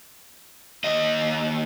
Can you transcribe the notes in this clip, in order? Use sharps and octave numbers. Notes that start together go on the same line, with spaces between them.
D#2 D#5